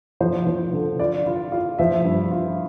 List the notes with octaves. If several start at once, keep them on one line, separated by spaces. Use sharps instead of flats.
F3 C5
F3
D3
F4 D5
F4
F4
F3 E5
G2
F4